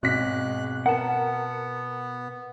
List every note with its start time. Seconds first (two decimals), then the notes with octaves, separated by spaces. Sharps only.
0.03 G#1 B2 G#3 F#6 B6
0.86 B3 A#4 F#5 A5